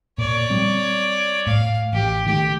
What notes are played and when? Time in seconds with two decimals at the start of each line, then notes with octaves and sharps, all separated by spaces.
0.18 A#2 C#5 D5
0.50 G3 C4
1.47 A2 F5
1.93 A1 G4
2.26 D#3 A3 G4